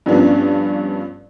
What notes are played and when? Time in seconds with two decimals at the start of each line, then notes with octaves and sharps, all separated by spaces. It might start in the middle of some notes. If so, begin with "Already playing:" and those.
0.06 G2 F3 B3 C#4 D4